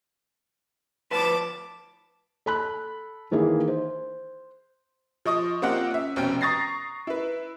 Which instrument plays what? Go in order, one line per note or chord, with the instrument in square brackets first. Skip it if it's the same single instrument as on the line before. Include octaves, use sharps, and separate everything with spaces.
[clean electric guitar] D2 F3 B4 [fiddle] A5 D6
[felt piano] A4 B5 F#6
D#3 E3 A#3 G#4
C5
[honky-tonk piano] F3 D#5 C#6 D#6
A#3 C4 F4 G4 D#5 F#5
C#4 E5
F1 B2 C4 C#4 G5
A#5 C#6 D#6 A6 A#6 C7
E4 B4